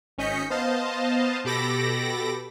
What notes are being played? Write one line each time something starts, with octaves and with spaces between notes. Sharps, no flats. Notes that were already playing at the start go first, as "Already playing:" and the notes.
G#1 C#4 D#5 G6 B6 C#7
B3 C5 D#5 F5 A5
B2 G4 A4 B5 D6 A#6